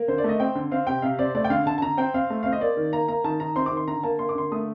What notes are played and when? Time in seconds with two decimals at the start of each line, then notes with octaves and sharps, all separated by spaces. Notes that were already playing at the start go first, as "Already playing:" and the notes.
Already playing: A#3
0.08 D3 C5
0.18 D5
0.24 A3 D#5
0.40 C4 G5
0.55 D3
0.71 C4 F5
0.87 C3 G5
1.02 C3 F5
1.18 C4 D5
1.35 A3 D5
1.44 G5
1.50 D3 F5
1.66 D3 A5
1.78 A5
1.82 D3 A#5
1.97 C4 G5
2.14 C4 F5
2.30 A3
2.43 C4 F5
2.52 D#5
2.61 A#3 D5
2.77 D#3
2.93 A#3 A#5
3.08 A#3 A#5
3.24 D#3 A5
3.40 D#3 A#5
3.56 C4 C6
3.66 D6
3.71 D#3
3.77 C6
3.88 D3 A#5
4.03 A#3 A5
4.19 A#3 C6
4.29 D6
4.35 D3 C6
4.52 A3 D#6